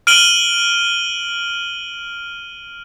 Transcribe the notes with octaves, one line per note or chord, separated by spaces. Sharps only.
F6 D7 D#7 F#7 G7